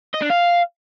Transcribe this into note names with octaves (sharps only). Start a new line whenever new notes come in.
D#5
D4
F5